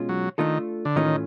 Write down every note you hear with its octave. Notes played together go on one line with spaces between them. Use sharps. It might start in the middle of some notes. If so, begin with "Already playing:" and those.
Already playing: B2 G#3 C#4 F4
F#3
D#3 A3 D4 F4 A4
D3
A2 D#3 E3 A3 C#4 F4